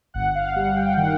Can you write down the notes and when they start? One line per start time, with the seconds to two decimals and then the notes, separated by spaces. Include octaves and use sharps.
0.14 G1 F#5
0.35 F5
0.56 G3 F#5
0.76 G5
0.97 D#3 F#5